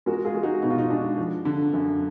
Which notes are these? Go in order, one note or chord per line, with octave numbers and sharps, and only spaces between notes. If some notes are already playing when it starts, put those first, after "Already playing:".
G#3 F#4 A#4
F4 G#4
G#3
D#4 F#4
B2 D#4
F4
D#4
G#3 D4
F3
D3
F#2